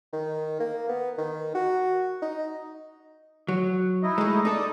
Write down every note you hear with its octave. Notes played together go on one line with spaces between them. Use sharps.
D#3
A#3
B3
D#3
F#4
D#4
F#3
D#4 E4 D#5
G#3 A3
D#4 A4 D5 D#6